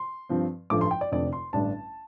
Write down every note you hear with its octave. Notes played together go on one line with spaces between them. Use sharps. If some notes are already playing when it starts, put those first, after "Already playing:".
Already playing: C6
G2 F3 C4
A1 G2 F3 A3 D6
C6
G5
D5
F1 F2 D3 D5
C6
A1 G2 D3 G3 D4 A5